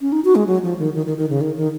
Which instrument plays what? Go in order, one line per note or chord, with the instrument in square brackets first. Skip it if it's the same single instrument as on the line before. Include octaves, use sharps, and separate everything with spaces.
[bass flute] C#4
D#4
F#4
G#3
F#3
F3
D#3
D#3
D#3
D#3
C#3
D#3
D#3